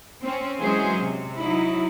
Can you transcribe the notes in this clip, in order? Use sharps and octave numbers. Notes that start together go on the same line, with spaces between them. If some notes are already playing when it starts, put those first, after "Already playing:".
C4 C#4
E3 F#3 G#3 C#4 G#4 C5
C3
F#3 D#4 E4